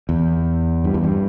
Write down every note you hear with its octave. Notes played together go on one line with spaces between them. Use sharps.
E2
G2
E2
G2